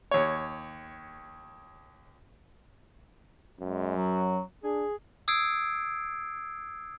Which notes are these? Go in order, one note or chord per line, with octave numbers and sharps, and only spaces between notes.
D#2 C#5
F#2 G#3
F#3
D4 G#4
D#6 E6 G#6 C7 D7